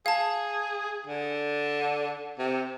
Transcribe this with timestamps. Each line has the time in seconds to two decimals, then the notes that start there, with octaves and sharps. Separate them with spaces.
0.06 G#4 F5 A5
1.07 D3
2.39 C3